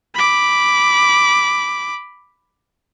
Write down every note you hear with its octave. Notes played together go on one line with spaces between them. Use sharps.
B5 D6